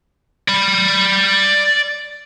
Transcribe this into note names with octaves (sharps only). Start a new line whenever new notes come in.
D5 B5